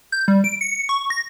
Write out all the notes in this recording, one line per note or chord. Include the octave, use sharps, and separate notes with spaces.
G6
G3
D7
C#7
C#6
A#6